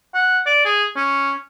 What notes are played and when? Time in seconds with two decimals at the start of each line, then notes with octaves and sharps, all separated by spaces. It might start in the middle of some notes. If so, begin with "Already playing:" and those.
0.14 F#5
0.46 D5
0.65 G#4
0.96 C#4